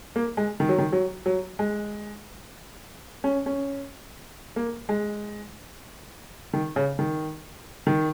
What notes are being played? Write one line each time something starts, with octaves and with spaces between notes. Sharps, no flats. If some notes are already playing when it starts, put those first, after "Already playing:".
A#3
G#3
D#3
F#3
D#3
F#3
F#3
G#3
C#4
C#4
A#3
G#3
D#3
C#3
D#3
D#3